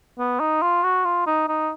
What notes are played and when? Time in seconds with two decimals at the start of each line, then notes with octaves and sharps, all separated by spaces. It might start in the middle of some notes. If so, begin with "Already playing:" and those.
0.18 B3
0.40 D#4
0.62 F4
0.84 F#4
1.05 F4
1.26 D#4
1.48 D#4